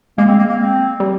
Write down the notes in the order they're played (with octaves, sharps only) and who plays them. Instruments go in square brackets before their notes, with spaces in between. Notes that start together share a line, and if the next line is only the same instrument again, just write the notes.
[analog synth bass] G#3 [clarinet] A#3
[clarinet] C4
A#3
A#3
C4
[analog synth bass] G3